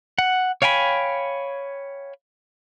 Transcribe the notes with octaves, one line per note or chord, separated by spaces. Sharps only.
F#5
C#5 F5 G5 G#5 B5